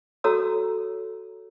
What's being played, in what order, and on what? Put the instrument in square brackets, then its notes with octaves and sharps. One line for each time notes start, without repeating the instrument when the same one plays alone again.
[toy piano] F#4 A4 C#5 A#5 E6